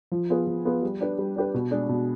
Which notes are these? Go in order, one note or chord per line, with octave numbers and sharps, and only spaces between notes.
F3
B3 F4 G#4 B4
F3
B3 F4 G#4 B4
G3
D4 G4 B4
G3
D4 G4 B4
B2
G#3 D4 G#4
B2